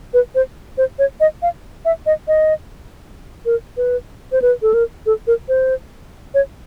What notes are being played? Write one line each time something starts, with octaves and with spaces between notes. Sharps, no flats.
B4
C5
C5
C#5
D#5
F5
E5
D#5
D#5
A#4
B4
C5
B4
A4
A#4
A4
A#4
C5
C#5